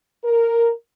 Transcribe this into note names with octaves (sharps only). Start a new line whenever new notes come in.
A#4